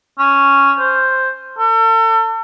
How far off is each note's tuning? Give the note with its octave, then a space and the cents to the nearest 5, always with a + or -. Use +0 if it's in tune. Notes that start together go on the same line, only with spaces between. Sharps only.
C#4 +0
C5 +0
A4 +35